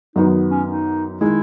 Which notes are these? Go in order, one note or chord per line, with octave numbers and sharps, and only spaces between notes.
F#2 D#3 F#3 B3 D#4
C#4
D#4
D#3 G#3 E4